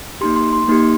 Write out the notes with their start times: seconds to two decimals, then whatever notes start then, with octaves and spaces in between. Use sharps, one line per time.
0.21 A#3 D#4 G4 C6
0.36 C6
0.53 C6
0.68 A#3 D#4 G4